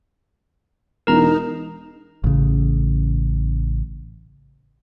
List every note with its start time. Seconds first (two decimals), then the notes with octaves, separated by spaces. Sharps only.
1.07 E1 D#4 A#4 A#5
2.24 A1 C#3